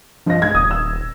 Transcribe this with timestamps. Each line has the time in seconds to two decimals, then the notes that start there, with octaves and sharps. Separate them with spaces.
0.26 G2 F3 D#5 A#6
0.42 G#3 G#6
0.55 D#1 D#6
0.71 E6